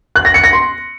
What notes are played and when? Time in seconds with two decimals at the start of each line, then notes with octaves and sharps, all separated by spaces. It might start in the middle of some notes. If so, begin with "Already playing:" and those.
0.16 F#6
0.25 A#6
0.34 C#7
0.44 A#6
0.53 C6